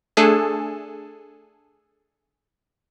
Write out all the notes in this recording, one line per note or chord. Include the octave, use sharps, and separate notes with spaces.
A3 D4 G#4 A4 G#5 A5